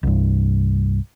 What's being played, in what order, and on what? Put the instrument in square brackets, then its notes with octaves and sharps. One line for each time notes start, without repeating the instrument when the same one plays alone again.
[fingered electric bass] C2 G2